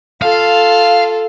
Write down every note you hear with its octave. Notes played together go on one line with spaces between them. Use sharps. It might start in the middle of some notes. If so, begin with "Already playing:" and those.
F4 A4 F5